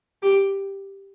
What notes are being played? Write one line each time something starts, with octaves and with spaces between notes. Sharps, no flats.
G4